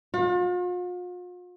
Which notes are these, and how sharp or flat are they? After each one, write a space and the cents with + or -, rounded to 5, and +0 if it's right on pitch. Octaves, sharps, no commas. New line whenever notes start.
F4 +45